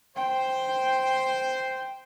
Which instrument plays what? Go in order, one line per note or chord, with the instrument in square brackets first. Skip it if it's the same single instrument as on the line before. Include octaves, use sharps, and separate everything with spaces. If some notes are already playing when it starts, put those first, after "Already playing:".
[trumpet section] C5 [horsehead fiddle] G5